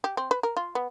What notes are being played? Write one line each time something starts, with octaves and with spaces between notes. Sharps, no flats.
G4
C4
B4
A#4
F4
B3